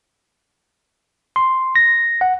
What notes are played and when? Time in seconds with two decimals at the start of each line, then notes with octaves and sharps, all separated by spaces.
1.36 C6
1.76 A#6
2.21 F#5